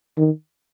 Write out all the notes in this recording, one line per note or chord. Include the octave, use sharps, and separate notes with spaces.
D#3